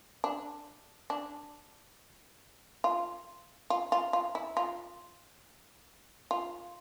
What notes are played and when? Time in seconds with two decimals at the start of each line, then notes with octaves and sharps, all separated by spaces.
0.24 D4
1.10 D4
2.84 F4
3.70 F4
3.92 F4
4.13 F4
4.35 E4
4.57 F4
6.31 F4